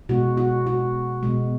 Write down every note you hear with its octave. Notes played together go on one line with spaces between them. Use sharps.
B2 G#3 F#4
F#4
F#4
B2 G#3